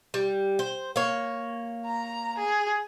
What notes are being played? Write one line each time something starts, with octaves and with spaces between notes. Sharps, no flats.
G3
C5
A#3 C#5
A#5
G#4